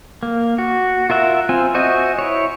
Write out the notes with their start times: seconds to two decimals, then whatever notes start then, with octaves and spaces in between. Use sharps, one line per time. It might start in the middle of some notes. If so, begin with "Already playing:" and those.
0.23 A#3
0.58 F#4
1.10 F4 A#4 E5 F#5
1.49 C4 F4 G#5
1.74 F#4 C5 D#5 E5 G#5
2.19 E4 C#5